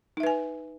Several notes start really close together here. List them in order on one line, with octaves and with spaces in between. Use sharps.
D#4 E5 B4 G#5